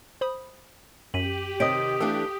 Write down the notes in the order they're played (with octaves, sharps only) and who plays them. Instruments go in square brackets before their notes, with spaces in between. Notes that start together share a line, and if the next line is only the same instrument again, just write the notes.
[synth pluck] C5 B5 D#6
[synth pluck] F#2 [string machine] G4 [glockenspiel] B6 D#7 F#7
[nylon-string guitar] C3 D#3 C4 [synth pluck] C#5 D#5 [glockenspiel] D#6 B6 D7
[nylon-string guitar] E3 A3 D4 [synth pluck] A4 F5